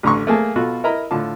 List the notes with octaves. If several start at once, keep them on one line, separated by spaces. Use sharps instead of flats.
A1 D3 A#5 C6 C#6
A3 A#3 G#4 A5
B2 F4 F#4 A4
E4 A#4 D#5 A#5 B5
A2 D3 D4 F4 A5